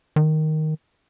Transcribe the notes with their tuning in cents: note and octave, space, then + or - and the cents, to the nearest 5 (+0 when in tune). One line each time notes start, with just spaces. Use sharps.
D#3 +0